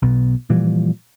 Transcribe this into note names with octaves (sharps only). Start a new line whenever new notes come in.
B1 B2
A#2 E3 F3 G3